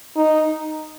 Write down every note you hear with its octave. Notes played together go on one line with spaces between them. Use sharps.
D#4